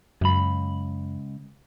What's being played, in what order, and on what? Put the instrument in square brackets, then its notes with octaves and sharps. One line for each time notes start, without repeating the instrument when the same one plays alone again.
[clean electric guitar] C#2 B5 [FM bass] F#2